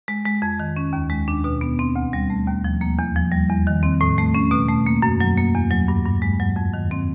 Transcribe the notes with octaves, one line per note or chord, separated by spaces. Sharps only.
G#3
G#3
F2
D#3
C#4
D#2
G#3
D4
B2
B3
C4
D2
G3
A3
D#2
F3
A#3
E2
F3
G3
E2
D#3
C4
A2
A3
C#4
B2
A3
A#3
F#2
F#3
A#3
E2
F#3
G2
G2
G#3
F#3
F2
D#3
C4